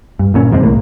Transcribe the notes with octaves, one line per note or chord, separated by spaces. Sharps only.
G2
G1 A#2 C#4
E2 G#2 C3 G#3
C2 A2 A#3